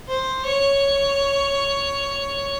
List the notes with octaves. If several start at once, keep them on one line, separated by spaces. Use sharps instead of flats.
C5
C#5